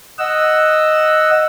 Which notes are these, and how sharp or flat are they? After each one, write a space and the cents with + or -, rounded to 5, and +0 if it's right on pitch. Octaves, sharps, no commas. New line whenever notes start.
D#5 +0 F#5 +0 E6 +0